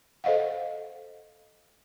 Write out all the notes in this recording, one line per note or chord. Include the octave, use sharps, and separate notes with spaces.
A4 C5 D#5 F5 F#5